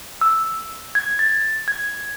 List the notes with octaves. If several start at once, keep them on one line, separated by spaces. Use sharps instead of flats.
E6
G#6
A6
G#6